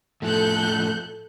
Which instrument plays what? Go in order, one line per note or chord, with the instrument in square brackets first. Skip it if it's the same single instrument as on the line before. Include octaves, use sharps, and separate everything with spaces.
[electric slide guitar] A2 F3 [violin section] A4 F#6 G6